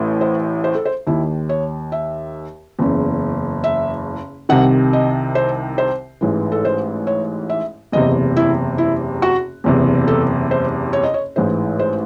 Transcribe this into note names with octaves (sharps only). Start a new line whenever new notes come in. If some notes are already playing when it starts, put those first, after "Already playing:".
Already playing: A1 A2 E3
C5
C5
A4
C5
D#2 D#3 E4
C#5
E5
F#1 E2 C#3
E5
C2 C3 D#3 F#5
D#5
C5
C5
A1 G#2 E3
A4
C5
C#5
E5
F#1 E2 C3 D#5
E4
E4
F#4
F#1 E2 C3
A4
C5
C#5
D#5
C#5
A1 G#2 E3 C5
C5